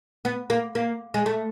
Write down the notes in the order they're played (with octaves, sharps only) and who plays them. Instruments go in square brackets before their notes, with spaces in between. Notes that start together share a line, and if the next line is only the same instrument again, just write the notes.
[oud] B3
A#3
A#3
G#3
A3